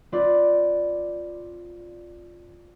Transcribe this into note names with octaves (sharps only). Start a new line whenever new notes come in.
C4 F4 B4 D5